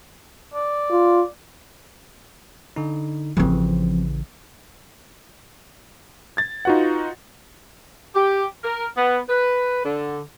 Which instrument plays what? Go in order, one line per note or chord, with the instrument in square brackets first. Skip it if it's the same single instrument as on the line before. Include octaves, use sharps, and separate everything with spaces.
[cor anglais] D5
[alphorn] F4
[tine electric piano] D3 D#4
[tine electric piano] A1 C#3 E3 [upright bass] F3 C4
[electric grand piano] G#6 A6
D#4 F4 F#4 B4 F#5
[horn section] G4
A#4
B3
B4
D3